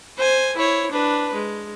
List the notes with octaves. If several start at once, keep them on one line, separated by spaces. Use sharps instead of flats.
C5 G#5
E4 C#5
D4 B4
G#3